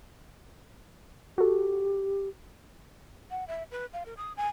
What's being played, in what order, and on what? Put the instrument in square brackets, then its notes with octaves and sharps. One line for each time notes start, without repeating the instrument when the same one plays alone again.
[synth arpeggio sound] F#4 A4 [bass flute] G4
[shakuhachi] F#5
E5
B4
F5
A#4
D#6
G#5